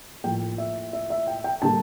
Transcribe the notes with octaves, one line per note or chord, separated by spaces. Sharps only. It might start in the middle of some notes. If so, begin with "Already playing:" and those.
A2 F3 A#3 G5
E5
E5
E5
G5
G5
D3 G3 A#3 A5